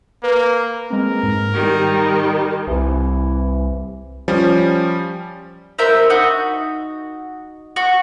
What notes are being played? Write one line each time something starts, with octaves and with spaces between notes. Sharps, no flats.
A#3 B4
G#3 A#3 C4 A#4
G#2
D#3 G3
B5
C2 E3
F3 G3 C#4
E4 A#4 C5 E5
D#4 F#4
F#4